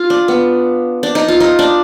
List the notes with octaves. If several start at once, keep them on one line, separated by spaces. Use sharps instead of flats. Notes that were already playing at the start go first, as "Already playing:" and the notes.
Already playing: F4
D4
B3
D4
D#4
F4
D#4
D4